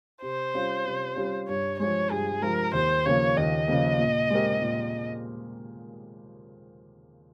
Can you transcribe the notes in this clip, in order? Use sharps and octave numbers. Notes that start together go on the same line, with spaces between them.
C3 C5
G3 C#4 F4
C3
G3 C#4 F4
G2 C#5
F3 G#3 C#5
G2 G#4
F3 G#3 A#4
D#2 C5
C#3 F3 A#3 C#5
D#2 D#5
C#3 F3 A#3
A#2
G#3 C4 G4 A#4
A#2